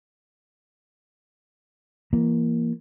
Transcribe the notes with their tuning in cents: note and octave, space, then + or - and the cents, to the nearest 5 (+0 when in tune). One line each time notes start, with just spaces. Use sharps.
E3 +30 A#3 +0